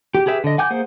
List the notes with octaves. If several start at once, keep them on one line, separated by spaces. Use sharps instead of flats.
G4
G4 G#4 B4 E5
D3 D#5
F#5 G#5 D6 G6
A#3 G#4 C5 F#5